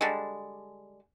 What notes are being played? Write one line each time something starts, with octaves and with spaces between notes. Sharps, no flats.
D3 G3 G#3